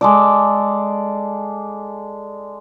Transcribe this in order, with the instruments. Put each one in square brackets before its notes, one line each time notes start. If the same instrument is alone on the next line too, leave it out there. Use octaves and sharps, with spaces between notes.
[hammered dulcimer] G#3 A4 D5